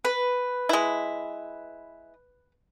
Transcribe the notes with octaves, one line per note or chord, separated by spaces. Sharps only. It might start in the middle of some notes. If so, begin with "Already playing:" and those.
B4
G#3 E4